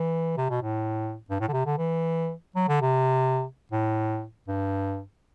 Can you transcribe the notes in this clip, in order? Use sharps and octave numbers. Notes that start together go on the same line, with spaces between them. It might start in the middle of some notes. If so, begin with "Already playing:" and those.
Already playing: E3
C3
B2
A2
G2
A2
D3
C3
D3
E3
F#3
D3
C3
A2
G2